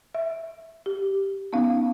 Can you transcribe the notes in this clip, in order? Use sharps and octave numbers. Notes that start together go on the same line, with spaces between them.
E5
G4
B3 C#4 D#4 F5